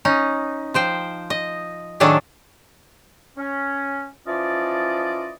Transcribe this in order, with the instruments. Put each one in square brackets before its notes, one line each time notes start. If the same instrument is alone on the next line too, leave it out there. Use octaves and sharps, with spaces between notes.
[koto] C#4 D#4
F3 C5 G5
D#5
A2 D#3 F#3 D4 G#4 A4
[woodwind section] C#4
E3 F3 C#4 F4 D5 D#5